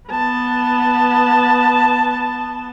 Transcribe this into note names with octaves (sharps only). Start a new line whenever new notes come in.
B3 A5